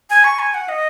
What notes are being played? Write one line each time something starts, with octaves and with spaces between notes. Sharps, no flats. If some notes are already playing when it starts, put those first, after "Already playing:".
G#5
C#6
G#5
F#5
D#5